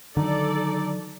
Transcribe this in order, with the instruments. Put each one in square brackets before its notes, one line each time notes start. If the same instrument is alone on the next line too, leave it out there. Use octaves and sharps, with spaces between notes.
[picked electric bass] D3 D#3 F#3 [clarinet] D#4 [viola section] A4 D5